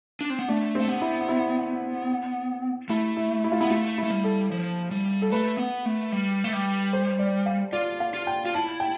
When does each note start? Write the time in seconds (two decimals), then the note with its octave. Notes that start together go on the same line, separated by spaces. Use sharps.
0.21 D4
0.30 C4
0.39 B3
0.48 A3 D4
0.75 C4
0.80 A3
0.88 B3
1.02 E4
1.29 E4
2.89 A3 E4
3.17 E4
3.44 E4
3.52 F4
3.60 B3 E4
3.70 A3 F4
3.98 E4
4.04 A3
4.10 G3
4.24 A4
4.52 F3
4.91 G3
5.22 A4
5.32 A3 B4
5.58 B3
5.85 A3
6.12 G3
6.44 A3
6.53 G3
6.93 C5
7.19 D5
7.46 F5
7.73 F4 D5
8.00 F5
8.14 F4
8.27 G5
8.46 F4
8.54 E4 A5
8.80 G5